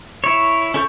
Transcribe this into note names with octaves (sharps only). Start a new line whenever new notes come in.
E4 C#5
C#4 E4 A4 C#6 G6